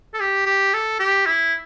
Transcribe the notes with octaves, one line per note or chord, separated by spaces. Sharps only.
A4
G4
G4
A4
G4
E4